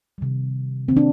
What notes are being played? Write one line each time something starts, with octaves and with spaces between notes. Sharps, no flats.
C3 D#3 G3
D#3 A#3 C4
D4